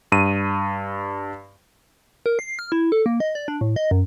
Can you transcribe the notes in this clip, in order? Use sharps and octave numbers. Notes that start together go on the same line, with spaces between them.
G2 D#7
A#4
C7
F6
E4
A4
A#3
D#5
D5
D4
A2
D#5
F#2